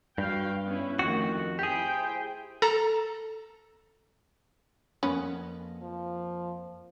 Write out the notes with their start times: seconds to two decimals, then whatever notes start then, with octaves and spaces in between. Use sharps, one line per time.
0.18 G2 F#4 F5 G5
0.66 B3 C#4 E4
0.99 F2 D#3 A3 F#4
1.59 E4 G4 G#4 C5 G5
2.62 A4 A#5
5.03 F2 A#3 B3 C#4
5.82 F3